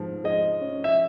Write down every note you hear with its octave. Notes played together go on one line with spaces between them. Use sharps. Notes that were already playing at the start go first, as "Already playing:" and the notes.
Already playing: G#2 F3
G#3 D#5
C#4
E5